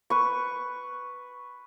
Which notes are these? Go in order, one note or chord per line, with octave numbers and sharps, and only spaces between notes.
B4 C#6